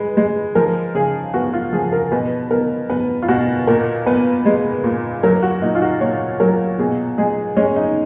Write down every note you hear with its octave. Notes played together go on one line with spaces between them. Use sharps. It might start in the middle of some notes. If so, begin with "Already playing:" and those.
Already playing: G#3 B4
G#3
F3 A#4
C#3 G#4
B3 F#4
F4
F3 G#4
A#4
B2 B4
B3 A#4
B3 B4
F4
B2 F#4
A#2 A#4
B3 B4
G#3
A#2
F#3 A#4
F#4
A#2 D#4
F4
F#4
A#2 C#5
F#3 A#4
B2 G#4
G#3 G#4
G#3 C#4
D#4